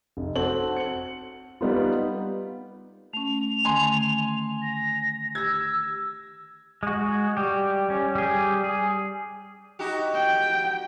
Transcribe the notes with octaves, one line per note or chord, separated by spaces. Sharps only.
F1
C4 F#4 A4 F#7
C#7 F#7
G3 B3 D#4 F4
A3 C#4 F7
D3 D#3 A3 G#5 C6
A#6
G4 E6 G#6 A#6
G#3 F#4
G3 G4
G3 C#4
G3 G#4
G#4
D#4 F#4 G4
G5